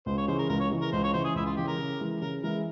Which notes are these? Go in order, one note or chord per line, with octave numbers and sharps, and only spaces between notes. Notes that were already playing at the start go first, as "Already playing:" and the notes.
C#2 C5
C#5
C#3 E3 C5
A#4
C#2 A#4
C#5
C#3 E3
A#4
C#2 C5
C#5
C#3 E3 C5
G#4
C#2 E4
F4
C#3 E3 G4
A#4
C#3
E3 G#3 E4
C#3 A#4
E3 G#3 E4 A#4